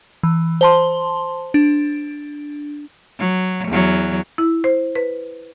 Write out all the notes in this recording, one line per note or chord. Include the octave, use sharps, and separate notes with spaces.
E3
C5 A5 C6
D4
F#3
E2 F#3
E4
C5
B4